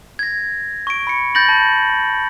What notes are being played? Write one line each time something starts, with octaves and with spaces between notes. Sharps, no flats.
G#6 A#6
C#6 D7
B5 C#7
B5 G6 A6 A#6 F#7
A5